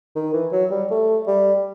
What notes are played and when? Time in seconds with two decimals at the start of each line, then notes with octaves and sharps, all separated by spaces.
0.15 D#3
0.33 E3
0.52 F#3
0.71 G3
0.91 A3
1.27 G3